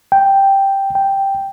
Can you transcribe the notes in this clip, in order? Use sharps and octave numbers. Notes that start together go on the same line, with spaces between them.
G5
G5